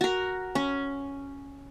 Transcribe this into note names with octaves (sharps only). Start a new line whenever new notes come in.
F#4 A#4
C#4